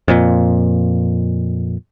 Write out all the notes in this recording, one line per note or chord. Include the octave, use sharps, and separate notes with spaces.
F2 A#2